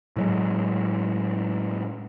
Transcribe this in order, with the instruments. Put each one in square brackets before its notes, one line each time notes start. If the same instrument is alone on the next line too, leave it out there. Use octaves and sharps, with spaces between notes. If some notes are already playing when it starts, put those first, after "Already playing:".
[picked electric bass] A2 F#3 G#3